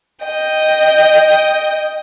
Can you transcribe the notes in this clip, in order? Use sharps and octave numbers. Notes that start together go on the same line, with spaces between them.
D#5 G5